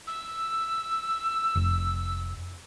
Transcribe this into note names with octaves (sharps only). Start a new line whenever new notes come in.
E6
F1